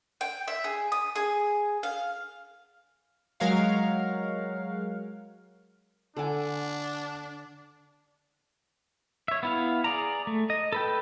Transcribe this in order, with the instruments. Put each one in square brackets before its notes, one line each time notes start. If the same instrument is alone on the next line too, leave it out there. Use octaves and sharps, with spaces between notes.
[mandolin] G5
E5
G#4
D#6
G#4
F5
[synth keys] F#3 G#3 A#4 C#5 F5 F#5
[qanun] D3 D6 [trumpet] D4 [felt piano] A4 F#5 G#5
[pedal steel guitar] C#5 E5
B3 E4 F5
G#4 D5 A#5
A3
D#5
A4 B4 G5